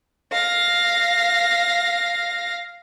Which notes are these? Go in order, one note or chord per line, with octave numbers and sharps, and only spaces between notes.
F5 A#6